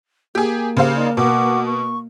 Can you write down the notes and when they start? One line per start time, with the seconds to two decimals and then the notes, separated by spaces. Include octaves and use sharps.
0.35 A#3 G4 G#4
0.77 C#3 G4 C5 F5
0.96 D#4 D5
1.17 B2 F#5 C#6 D6
1.65 C#6